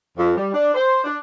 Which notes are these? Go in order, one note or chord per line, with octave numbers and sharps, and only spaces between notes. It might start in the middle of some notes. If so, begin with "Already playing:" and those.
F2
G3
D4
C5
D4